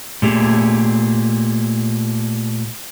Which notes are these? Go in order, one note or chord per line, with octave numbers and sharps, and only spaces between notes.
A#2 A3 G4 G#4